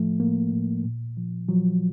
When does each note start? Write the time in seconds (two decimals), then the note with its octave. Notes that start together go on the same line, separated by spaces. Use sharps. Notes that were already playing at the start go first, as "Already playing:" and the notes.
Already playing: A2 F3 A3
0.20 A2 A#3
0.52 A2
0.84 A#2
1.17 F3
1.49 F3 F#3